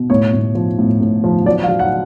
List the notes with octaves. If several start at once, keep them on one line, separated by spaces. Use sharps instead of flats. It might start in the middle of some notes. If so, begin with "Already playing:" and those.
Already playing: B2
A2 C#5
A2
F3
A2
A2
F3
F#3 D5
F5
F#3
F#5